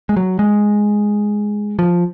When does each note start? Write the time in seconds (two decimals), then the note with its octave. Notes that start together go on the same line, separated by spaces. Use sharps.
0.09 G#3
0.17 F#3
0.39 G#3
1.79 F3